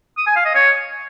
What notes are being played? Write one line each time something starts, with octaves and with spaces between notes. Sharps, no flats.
D#6
G#5
F5
D#5
C#5